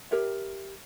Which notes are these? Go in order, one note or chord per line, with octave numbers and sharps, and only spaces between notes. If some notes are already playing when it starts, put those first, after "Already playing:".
G4 A#4 C#5 E5